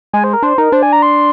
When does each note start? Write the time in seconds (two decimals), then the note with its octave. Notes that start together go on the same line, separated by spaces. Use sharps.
0.13 G#3 G#5
0.24 C5
0.33 A#4
0.43 D4 C5
0.58 D#4 A#4
0.72 D4 C5
0.83 G#5
0.93 A#5
1.02 C6